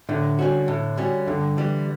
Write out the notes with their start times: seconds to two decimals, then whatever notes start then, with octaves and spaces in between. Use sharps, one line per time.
0.09 A2 D3
0.39 G3 C#4 F#4
0.68 A2
0.97 G3 C#4 F#4
1.27 G2 D3
1.57 E3 G3